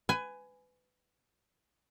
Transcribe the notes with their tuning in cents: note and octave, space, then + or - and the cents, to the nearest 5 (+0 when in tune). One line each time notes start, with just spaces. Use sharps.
B4 +25 G#5 +5